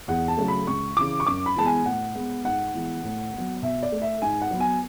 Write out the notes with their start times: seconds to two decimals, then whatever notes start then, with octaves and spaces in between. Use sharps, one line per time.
0.08 E2 F#5
0.28 A5
0.37 C#3 F#3 A3
0.48 B5
0.67 C#2 C#6
0.97 C#3 E3 D6
1.20 C#6
1.26 F#2 D6
1.46 B5
1.56 E3 G#3 B3 A5
1.66 G#5
1.86 A2 F#5
2.15 G#3 B3
2.45 G#2 F#5
2.74 E3 G#3 B3
3.03 A2
3.34 F#3 B3
3.62 B2 E5
3.83 D5
3.92 A3
4.02 E5
4.22 G#2 G#5
4.42 F#5
4.51 F#3 B3
4.60 G#5